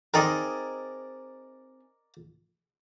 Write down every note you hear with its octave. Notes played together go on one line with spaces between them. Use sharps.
C4 D#4 G#4 A#4 D5 D#5